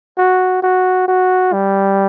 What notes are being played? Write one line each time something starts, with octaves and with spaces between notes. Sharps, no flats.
F#4
F#4
F#4
G3